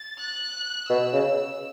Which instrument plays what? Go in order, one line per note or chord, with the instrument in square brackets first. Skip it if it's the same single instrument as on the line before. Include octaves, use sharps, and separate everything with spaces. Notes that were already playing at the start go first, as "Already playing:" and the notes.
Already playing: [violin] A6
F#6
[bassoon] B2 [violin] E6
[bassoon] C#3